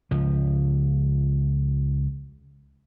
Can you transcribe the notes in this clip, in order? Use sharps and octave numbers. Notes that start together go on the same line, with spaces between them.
C#2 F3